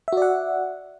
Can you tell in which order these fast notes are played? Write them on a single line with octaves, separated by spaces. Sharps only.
E5 F#4 D5 F#5